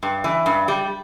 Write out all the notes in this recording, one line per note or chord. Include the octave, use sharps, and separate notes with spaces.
G2
E3
G2
G3